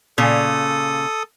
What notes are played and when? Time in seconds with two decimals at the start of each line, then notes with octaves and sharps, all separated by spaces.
0.18 A#2 C#3 A4 D#6